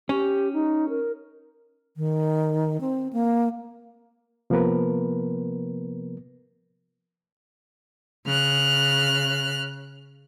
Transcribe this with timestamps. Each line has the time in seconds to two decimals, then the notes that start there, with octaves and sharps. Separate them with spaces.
0.09 C#4 G4
0.53 D#4
0.89 A#4
1.97 D#3
2.81 C4
3.13 A#3
4.50 C3 F3 A#3 B3 A#4 B4
8.26 C#3 F6 F#6